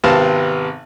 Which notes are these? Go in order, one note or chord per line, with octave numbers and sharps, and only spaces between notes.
G#1 C3 B3 C4 F5 A5